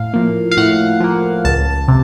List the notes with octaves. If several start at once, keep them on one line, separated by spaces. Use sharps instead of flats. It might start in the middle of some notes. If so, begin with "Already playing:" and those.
Already playing: A2 F5
F3 A#3
F5
A2 F#5
F3 A#3
C#2 A5
C3